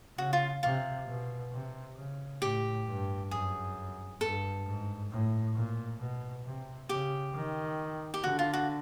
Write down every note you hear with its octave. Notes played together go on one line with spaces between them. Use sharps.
C#3 F#4
F4
C3 F4
B2
C3
C#3
A2 G4
G2
F#2 G#4
G2 A4
G#2
A2
A#2
B2
C3
C#3 G4
D#3
G4
D3 F#4
F4
F#4